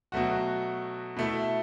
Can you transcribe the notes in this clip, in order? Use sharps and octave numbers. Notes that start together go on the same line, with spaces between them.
B2 F#3 A3 F#4
B2 A3 E4